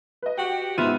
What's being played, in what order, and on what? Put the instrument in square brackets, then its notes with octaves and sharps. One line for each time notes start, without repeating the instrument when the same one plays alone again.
[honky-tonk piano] B4 D#5
[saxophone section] F#4 G4 [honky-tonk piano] G5
[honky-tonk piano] G#2 D#7 [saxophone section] C3 E5 [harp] B3 F4